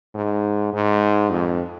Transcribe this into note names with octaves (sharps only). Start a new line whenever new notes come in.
G#2
G#2
F2